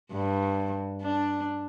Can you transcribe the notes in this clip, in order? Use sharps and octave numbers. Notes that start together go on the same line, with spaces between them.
G2
D4